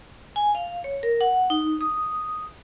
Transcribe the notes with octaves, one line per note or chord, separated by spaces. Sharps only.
G#5
F5
C#5
A#4
F#5
D#4
D#6